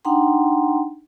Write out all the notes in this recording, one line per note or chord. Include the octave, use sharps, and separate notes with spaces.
D4 D#4 F#5 G5 A#5 C6